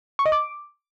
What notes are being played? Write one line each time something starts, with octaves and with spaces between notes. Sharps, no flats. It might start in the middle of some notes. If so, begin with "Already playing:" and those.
C#6
D#5
D6